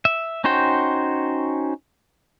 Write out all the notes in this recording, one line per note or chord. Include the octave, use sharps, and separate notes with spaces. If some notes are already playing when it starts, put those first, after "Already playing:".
E5
C#4 D#4 F#4 C5 G5